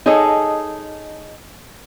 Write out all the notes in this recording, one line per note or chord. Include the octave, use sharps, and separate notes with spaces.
D#4 G#4 A4 C#5 D#5